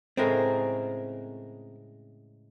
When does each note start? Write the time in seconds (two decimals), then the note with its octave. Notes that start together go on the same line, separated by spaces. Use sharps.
0.17 A2 C#3 G#3 C4 A#4